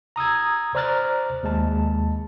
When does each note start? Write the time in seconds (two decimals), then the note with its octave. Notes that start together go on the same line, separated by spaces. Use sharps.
0.16 A#5 D#6 E6 G#6
0.75 C5 D5 A#5 F6 F#6 A6
1.43 D#2 G#3 A5